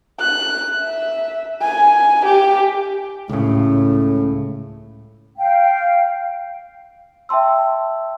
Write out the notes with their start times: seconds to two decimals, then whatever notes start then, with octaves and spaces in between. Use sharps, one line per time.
0.20 F#6
0.79 E5
1.61 G#5
2.26 G4
3.29 C#2 A2 C#3
5.38 F5 G5
7.29 E5 G5 A5 C6 E6